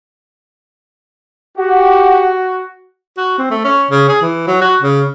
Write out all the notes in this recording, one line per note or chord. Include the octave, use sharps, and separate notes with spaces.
F#4 G4 F#5
F#4
C4
A3
C#4
C#3
G#4
E3
F#3
F#4
C#3